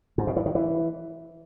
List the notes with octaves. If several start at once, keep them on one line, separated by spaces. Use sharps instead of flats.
G#2
B2
E3
D#3
E3